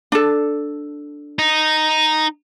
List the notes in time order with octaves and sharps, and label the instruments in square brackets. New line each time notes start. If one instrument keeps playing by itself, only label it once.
[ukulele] D4 A4
[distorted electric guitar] D#4